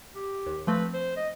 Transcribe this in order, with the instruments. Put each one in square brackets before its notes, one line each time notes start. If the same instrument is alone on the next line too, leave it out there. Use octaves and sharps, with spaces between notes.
[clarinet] G4
[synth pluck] D#2
[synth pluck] F3 A3 C4 [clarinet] B4
[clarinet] C5
D#5